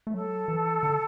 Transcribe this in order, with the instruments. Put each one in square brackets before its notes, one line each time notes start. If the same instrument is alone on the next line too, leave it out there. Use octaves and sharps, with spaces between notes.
[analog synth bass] A3
[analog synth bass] F#3 [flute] A4
[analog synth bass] E3
D3